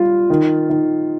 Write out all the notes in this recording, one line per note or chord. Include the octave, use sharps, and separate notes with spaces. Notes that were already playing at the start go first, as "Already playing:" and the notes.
Already playing: G3 F4
D#3
D#3